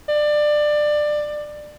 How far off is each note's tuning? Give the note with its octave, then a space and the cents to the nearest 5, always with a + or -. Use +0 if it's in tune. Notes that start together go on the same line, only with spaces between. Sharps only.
D5 +20